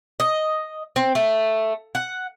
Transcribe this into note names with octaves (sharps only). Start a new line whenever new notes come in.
D#5
C4
A3
F#5